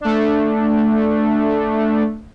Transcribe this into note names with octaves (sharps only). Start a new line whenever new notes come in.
A3 D4